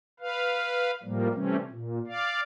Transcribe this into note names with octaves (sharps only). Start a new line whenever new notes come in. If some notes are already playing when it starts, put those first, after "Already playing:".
B4 F5
A2 F3 G3 A#3
C3 E3 G3 A3 C4 C#4
A#2
D5 F5